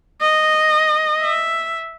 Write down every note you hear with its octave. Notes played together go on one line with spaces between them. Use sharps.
D#5
E5